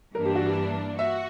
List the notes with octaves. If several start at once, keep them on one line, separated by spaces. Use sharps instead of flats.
G2 E3 A#3 D4 A#4
G4
F#4
G4
F#4 E5